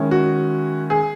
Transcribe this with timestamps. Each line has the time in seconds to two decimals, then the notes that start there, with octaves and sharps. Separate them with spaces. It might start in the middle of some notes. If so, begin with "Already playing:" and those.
Already playing: D#3 G#3 C#4 E4
0.11 F#4
0.90 G#4